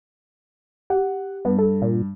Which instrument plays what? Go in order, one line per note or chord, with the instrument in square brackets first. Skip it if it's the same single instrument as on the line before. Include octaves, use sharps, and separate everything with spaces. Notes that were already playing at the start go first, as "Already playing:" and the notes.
[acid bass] G4 [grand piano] F#5
[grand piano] G2 [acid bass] B3
[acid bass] A4
A#2